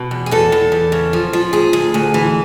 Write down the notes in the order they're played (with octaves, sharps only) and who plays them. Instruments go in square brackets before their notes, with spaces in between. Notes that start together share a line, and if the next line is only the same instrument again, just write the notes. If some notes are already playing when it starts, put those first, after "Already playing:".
Already playing: [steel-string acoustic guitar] B2
E2
G#4
E2 A4
E2
E2
C#3
F3
F3
D2 G#4
D2
D2
E3